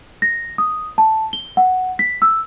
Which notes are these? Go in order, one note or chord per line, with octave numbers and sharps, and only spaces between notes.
A#6
D#6
A5
G7
F#5
B6
E6